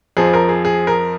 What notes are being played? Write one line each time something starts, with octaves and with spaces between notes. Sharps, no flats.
F2 F3 G#4
A#4
G#4
G#4
A#4